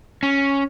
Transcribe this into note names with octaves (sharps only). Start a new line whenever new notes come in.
C#4